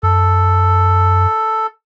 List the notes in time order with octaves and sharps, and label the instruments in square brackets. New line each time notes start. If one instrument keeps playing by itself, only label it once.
[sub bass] F#2 [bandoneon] A4